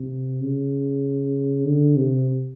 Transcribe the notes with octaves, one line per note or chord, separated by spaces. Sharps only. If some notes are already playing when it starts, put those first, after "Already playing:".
Already playing: C3
C#3
D3
C3